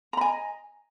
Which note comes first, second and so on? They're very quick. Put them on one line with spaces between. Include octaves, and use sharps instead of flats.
A#5 B5 G#5 D#5